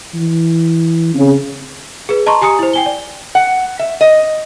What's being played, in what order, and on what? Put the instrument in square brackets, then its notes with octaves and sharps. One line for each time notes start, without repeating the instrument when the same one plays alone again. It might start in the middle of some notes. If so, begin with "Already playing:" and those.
[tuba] E3
[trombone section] C#3 [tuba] C4
[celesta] G#4 B4
D#5 A5 A#5 C6 C#6
G4 G#5 A#5 D#6 C#7
E4 C5
G5 G#5 G7
D5
[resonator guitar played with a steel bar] F#5
E5
D#5